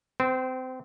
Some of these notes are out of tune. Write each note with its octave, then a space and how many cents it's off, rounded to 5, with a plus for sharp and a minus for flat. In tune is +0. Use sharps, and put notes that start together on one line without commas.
C4 -25 C5 +0